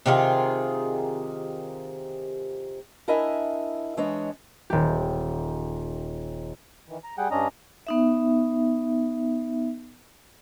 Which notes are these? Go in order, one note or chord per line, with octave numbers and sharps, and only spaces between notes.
C3 D#3 F4 G#4
D4 E4 A#4 D#5 E5 G#5
E3 G#3 D4 C#5 D#5
D#1 G4
D#3 E3
A#5
G3 G#4 F#5 G5
G2 C#4 D4 D#5 A#5
B3 D#4 E5